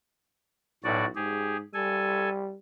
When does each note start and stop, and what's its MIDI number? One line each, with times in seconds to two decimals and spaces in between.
0.84 1.09 35
0.84 1.05 45
0.84 1.05 66
0.84 1.05 74
1.15 1.63 44
1.15 1.57 67
1.15 1.57 68
1.74 2.55 55
1.74 2.29 69
1.74 2.29 80